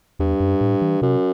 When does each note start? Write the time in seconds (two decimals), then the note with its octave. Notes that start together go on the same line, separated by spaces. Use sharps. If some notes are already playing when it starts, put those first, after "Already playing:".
0.19 E2 G2
0.40 F#2
0.61 A2
0.82 E3
1.02 F#2 C3